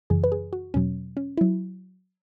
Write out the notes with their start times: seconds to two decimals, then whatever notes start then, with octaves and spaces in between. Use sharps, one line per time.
0.10 F#2 C#3 E3 G#4
0.24 B4
0.32 G#4
0.53 F#4
0.74 E2 B2 F#3 C#4
1.17 C#4
1.37 F#3 E4